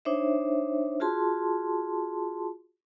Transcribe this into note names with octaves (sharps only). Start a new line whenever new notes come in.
D4 D#4 C5 C#5 E5
F4 F#4 G#4 A5 C6